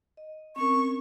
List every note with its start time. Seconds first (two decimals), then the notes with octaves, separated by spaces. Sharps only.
0.17 D#5
0.56 C4 C#4 A#4 C#6